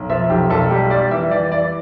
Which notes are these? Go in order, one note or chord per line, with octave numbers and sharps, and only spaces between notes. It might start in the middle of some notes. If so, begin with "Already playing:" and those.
Already playing: B1
F3 E5
B1 G4
B1 A4
G3 G4
G3 D5
E3 E5
E3 D5
E3 D5